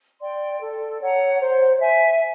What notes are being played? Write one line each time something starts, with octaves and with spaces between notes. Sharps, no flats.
D5 G5 C6
A4
C#5 F#5 A#5
C5
E5 G#5